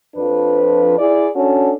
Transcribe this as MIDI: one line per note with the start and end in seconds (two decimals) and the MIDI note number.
0.16 0.97 41
0.16 0.97 53
0.16 0.97 62
0.16 0.97 71
0.99 1.29 64
0.99 1.29 68
0.99 1.29 74
1.35 1.71 61
1.35 1.71 62
1.35 1.71 66
1.35 1.71 69